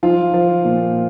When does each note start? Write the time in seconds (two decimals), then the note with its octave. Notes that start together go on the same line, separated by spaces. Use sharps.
0.03 F3 F4
0.34 F3
0.65 A#2